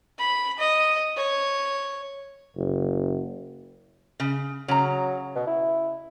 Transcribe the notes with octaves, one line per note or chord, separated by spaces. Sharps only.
B5
D#5
C#5
F#1
C#3
C#3 F#3 A#5
B2
E4